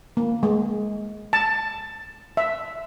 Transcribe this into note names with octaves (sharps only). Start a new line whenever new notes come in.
A#3
G#3
A5
E5